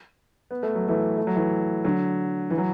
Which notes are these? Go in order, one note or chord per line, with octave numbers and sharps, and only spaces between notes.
B3
A3
F#3
E3 A3
A3
F#3
E3 A3
D3 F#3
E3
F#3